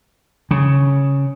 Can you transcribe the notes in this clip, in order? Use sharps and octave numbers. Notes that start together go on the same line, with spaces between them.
C#3